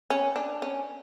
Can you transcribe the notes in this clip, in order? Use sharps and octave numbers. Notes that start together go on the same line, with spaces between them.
C#4
D4
C#4